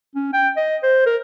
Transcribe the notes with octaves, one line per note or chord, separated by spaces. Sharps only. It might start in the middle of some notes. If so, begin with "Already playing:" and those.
C#4
G5
D#5
C5
A#4